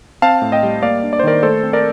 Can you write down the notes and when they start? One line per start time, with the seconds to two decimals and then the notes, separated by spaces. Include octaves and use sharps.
0.22 C4 F5 A5
0.42 A2
0.52 D#5 G5
0.63 G3
0.82 A#3 D5 F5
1.03 D4
1.13 D5
1.19 C5
1.23 D#3 A#4 D5
1.43 A3 A4 C5
1.63 C4
1.73 A#4 D5